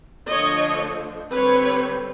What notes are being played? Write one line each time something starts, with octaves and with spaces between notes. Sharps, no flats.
D3 F3 A3 D4 C#5 D#5
D3 G3 C4 B4 C#5